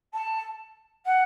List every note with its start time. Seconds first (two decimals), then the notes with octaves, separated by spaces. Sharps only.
0.13 A5
1.05 F#5